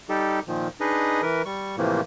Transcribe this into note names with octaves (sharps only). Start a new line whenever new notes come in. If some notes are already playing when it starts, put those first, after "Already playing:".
G3 D#4 G4 A4
A#2 D#3 F3
D4 D#4 G#4 B4 D#5
E3 A#4 B4
G3 C#6
A2 C3 E3 F3 A3 A#3